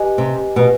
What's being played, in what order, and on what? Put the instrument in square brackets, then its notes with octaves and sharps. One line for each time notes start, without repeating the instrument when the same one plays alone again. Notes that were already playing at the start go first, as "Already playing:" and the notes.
Already playing: [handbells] G4 B4 D#5 G#5
[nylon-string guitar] C3
B2